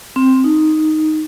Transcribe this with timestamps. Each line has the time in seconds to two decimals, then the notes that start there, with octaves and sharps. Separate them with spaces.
0.16 C4
0.44 D#4